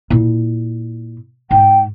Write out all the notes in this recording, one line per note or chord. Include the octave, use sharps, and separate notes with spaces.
A#2 E4
G#2 G5